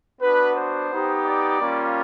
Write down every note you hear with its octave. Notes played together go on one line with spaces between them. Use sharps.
B3 D4 F#4 B4
C5
B3 D#4 G4
D5
G3 A#3 C#4 F4